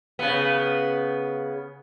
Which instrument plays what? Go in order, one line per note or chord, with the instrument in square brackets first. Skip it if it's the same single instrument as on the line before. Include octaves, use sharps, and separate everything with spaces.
[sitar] C#3 B3